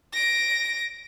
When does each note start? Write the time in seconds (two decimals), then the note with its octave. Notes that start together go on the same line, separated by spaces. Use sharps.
0.14 A#6 D7